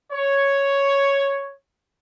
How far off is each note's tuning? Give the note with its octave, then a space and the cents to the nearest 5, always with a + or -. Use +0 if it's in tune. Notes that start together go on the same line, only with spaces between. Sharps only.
C#5 +0